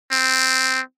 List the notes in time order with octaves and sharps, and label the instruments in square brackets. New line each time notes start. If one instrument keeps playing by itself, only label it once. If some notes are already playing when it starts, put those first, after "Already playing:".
[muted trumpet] C4